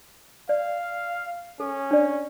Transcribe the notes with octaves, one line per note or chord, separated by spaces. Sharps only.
D5 F5
C#4 A4
D4 D5